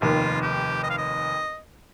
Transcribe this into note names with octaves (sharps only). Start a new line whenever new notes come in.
F1 D#2 D#3 F4
G4
D#5
F5
D#5